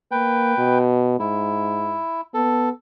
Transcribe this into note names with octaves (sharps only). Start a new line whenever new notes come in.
A#3 B4 G5
B2
G#2 E4
B3 A4